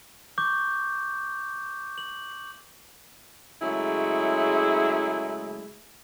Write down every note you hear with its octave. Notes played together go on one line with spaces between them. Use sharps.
C#6 D6 G6
F#7
C#3 F#3 G#3 A3 E4 G#4